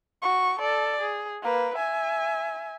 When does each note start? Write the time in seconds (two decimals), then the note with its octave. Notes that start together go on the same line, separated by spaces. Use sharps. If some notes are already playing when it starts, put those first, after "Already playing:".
0.22 F#4 C#6
0.59 A4 D5
1.01 G#4
1.42 A#3 B4
1.76 E5 G#5